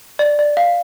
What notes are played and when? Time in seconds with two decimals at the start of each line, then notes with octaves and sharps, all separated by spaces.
0.19 D5
0.39 D5
0.57 F5